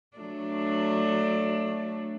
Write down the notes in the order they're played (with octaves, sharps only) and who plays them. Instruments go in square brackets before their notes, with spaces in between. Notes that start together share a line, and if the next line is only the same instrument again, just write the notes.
[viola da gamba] F#3 A3 D4